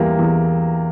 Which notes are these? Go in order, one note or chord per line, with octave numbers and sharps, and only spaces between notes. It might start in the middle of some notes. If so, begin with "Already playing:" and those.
Already playing: E2 E3 G3 A#3
E2